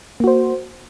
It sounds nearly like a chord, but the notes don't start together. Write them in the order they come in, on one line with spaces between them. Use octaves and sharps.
A#3 F#4 C5